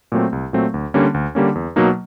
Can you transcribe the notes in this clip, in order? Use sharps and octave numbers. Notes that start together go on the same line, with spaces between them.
A#2 F#3 A3 C4
C2
A#2 F#3 A3 C4
D2
D3 G3 A#3 C#4
D2
D3 G3 A#3 C#4
E2
B2 F#3 A#3 D#4